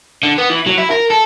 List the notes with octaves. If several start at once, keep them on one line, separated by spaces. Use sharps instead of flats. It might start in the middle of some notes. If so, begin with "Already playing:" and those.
D3
B3
E3
F#3
E4
A#4
A4